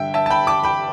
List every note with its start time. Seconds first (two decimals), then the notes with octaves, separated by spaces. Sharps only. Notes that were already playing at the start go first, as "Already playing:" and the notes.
Already playing: G2 D3 E5 G5
0.14 E5 A5
0.26 A5
0.30 G5 B5
0.47 A5 D6
0.63 G5 B5